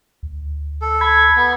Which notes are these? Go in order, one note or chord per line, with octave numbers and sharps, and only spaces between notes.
D2
A4
B5 G#6
B3